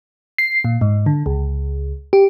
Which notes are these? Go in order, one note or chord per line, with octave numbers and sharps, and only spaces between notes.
C7
A#2
G#2
D3
C#2
G4